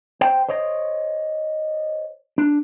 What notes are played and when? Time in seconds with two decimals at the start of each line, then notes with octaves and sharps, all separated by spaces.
0.21 C5 G5
0.49 C5 C#5 D#5
2.38 D4